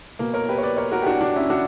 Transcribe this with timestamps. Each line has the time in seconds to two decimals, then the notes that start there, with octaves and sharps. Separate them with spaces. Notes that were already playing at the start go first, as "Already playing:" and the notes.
0.19 B2 A#3
0.34 A#4 C#5
0.49 G4 B4
0.58 C#5
0.63 B4 D5
0.77 A#4 C#5
0.92 F#4 A#4
1.02 G4
1.06 D4 F#4
1.21 D4
1.36 C#4 E4
1.50 D4 F#4